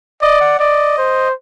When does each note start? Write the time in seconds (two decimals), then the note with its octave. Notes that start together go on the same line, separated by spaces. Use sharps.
0.22 D5 D#5
0.41 F#5
0.59 D5 D#5
0.98 C5